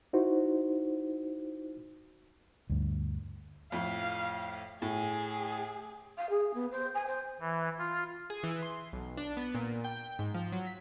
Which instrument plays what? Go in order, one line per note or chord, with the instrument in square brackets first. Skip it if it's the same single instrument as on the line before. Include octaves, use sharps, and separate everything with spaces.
[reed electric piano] D#4 E4 F#4 C5
[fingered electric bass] D2 G2
[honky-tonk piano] F2 A2 [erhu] F5
[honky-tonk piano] A2 [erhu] G#4
[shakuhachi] F5
G#4
B3
C5
G#5
C5
[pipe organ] E3
F4
[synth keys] G#4
E3
C6
B1
D4
B3
A#2
G5
G#2
F3
F#3
B6